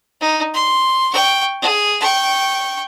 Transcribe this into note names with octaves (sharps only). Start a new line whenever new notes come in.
D#4
C6
G5 C#6
G#4
G5 C#6